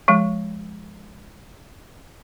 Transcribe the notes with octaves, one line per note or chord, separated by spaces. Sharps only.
F3 G#3